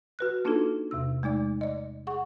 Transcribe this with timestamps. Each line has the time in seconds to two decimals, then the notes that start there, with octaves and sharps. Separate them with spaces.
0.19 F#4 B4 F#6
0.45 A#3 D4 D#4 F4 F#4 A4
0.91 E2 C3 E6
1.23 G#3 A3 D#4 D5
1.61 D5 D#5
2.07 G#4 F#5 C#6